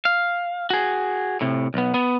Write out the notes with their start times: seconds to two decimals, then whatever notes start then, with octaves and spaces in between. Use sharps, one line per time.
0.05 F5
0.70 F#4 G#4
1.41 A2 C3
1.74 B1 B3
1.94 B3